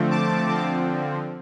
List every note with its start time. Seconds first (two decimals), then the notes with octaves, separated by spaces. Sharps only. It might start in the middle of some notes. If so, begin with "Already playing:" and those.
Already playing: D3 F3 A3 C4
0.11 A5 D6
0.46 D3 F3 C4